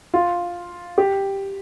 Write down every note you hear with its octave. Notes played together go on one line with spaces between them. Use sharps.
F4
G4